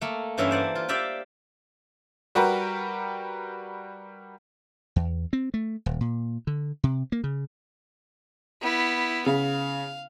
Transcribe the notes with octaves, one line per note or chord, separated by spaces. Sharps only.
A3 A#3
G2 E3 C#4 E5 F#5 C6
C5 D5 F#5 G#5
F4
G4 D5 E5 F5 G5
G3 F#4 G4 A#4 B4
E2
C4
A3
D#1
A#2
D3
C3
A#3
C#3
B3 E4
C#3 F5